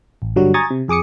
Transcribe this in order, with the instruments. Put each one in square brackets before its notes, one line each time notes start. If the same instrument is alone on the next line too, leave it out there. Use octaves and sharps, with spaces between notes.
[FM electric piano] A1
G2 D3 F#3 G3 F#4
G#5 A#5 C#6 D#6 G#6 A6
C3
F2 G#4 D6 D#6 C#7